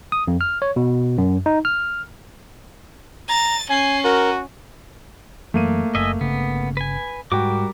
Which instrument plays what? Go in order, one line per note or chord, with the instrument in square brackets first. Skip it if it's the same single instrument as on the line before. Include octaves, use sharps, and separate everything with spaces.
[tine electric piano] D#6
F2
F6
C#5
B2
F#2
D#4
F6
[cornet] A#5 [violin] A6
[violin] C#4 [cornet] G#5 [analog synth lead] C7
[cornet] F#4 [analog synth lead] A#4
[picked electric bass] F#2 E3 F#3 [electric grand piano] A3 A#3 D#7
[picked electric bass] F#1 [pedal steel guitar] D#5 E5 G#5
[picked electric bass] G1 C#3 [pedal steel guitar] B3
[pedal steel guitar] B4 G#5
[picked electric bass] G#2 [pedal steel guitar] G3 A#4 D6 [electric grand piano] F#4 G5